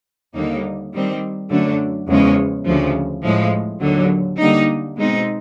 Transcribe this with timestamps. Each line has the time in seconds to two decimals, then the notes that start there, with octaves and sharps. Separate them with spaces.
0.34 D#2 D3 G3 A#3 D#4
0.93 D#3 G3 C4
1.50 F#2 D3 F#3 A3 D4
2.08 E2 C#3 F3 G#3 C#4
2.66 D2 C#3 F3
3.23 A2 F3 G#3
3.80 D#2 D3 F#3
4.38 D3 G3 A#3 D#4
4.97 B2 G#3 C4 D#4